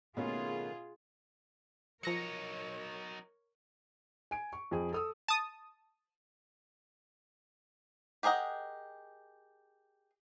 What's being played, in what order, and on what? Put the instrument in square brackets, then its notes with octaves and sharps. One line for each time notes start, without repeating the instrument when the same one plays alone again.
[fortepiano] B2 C#4 [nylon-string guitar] D#3 A3 A#3 [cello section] F4 G#4
[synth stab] F3 A#6 C#7 [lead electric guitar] F#3 D#4 [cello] A#4 C#5
[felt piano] G#5 D7
C#6
F2 G#4
A4 D#6 E6
[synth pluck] A5 D#6
[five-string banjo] G4 G#4 A#4 D#5 F#5